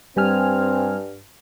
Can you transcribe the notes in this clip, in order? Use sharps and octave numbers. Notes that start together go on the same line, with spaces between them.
G2 G3 C4 G#5 F6